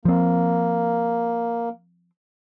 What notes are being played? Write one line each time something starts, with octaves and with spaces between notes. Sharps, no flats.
F3 A#3 C4